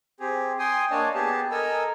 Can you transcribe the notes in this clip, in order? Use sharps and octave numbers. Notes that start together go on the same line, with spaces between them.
C4 G4 G#4
G5 G#5 C6 D#6
A#3 D4 C#5 D#5 G#5 A5
B3 G4 G#4 A5
A4 A#4 D#5 G#5 A#5 E6